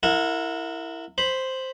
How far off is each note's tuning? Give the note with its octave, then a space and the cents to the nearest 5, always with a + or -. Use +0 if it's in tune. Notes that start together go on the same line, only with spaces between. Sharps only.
E4 +5 A#4 -25 F#5 -35
C5 +0 B5 +0